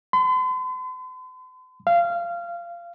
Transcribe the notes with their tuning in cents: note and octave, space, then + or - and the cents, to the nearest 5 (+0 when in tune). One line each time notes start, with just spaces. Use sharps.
C6 -45
F5 -20